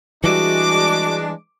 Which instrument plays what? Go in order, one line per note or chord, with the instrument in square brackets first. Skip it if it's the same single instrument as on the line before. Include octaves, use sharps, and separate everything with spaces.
[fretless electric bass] E3 G3 [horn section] G#3 D4 [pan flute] F#4 [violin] D6